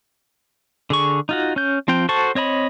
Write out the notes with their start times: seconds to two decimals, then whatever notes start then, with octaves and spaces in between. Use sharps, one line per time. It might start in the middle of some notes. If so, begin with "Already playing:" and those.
0.90 D3 G#4 C#6
1.29 D#4 F4 F#4
1.56 C#4 G6
1.88 F3 C4 F4 G5
2.09 F#4 A4 C5 A5 C#6
2.35 C4 C#5 D#5 B5